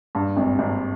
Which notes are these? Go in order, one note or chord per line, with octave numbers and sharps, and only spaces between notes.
G2
G#1
G#1